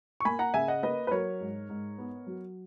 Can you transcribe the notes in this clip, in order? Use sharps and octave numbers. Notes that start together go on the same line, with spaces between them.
C#6
A#3 G#5 B5
F#5 A#5
C#3 E5 G#5
D#5 F#5
A#3 B4 D#5
B4
F#3 A#4 C#5
G#2
G#2
B3
F#3